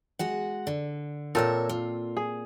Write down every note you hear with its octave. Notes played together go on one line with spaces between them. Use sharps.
G#3 F#4 F#5
D3
A#2 C4 A4 A#4 C#5 E5
F4
G#4